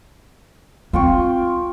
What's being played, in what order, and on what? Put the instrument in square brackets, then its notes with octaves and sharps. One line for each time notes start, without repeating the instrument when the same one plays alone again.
[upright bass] C4 [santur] F4 G5 C#6